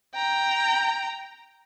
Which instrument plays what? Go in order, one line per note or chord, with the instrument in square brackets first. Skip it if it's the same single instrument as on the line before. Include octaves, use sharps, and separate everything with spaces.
[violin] G5 A#5